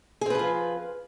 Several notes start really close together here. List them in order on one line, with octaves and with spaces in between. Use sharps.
G#4 C4 B4 F3 F4